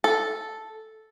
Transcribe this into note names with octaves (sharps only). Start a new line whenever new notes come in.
A4